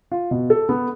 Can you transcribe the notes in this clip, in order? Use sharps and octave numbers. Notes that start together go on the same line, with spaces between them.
F4
B2
A4
B3